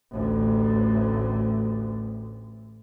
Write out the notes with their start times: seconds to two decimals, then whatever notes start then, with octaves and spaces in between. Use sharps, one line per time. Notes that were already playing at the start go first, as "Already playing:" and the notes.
0.12 A1 D2